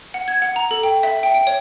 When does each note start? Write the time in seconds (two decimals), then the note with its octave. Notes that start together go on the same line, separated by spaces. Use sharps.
0.14 F#5
0.28 G#6
0.42 F#5
0.56 A#5
0.71 A4
0.83 G5
1.03 E5
1.23 G5
1.34 D7
1.47 C#5